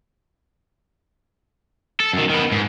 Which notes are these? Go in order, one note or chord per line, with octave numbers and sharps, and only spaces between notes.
A4
F#2 D#3
D#3 B3
G#2